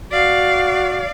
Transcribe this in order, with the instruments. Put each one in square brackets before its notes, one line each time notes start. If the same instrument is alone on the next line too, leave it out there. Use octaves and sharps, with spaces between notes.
[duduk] F#4 [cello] D5 F5